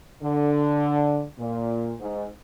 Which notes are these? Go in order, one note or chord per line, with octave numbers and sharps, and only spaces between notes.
D3
A#2
G#2